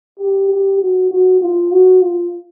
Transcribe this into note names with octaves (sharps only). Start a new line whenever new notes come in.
G4
G4
F#4
F#4
F4
F#4
F4